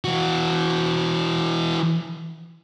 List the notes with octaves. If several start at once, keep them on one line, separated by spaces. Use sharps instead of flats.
E3 F#4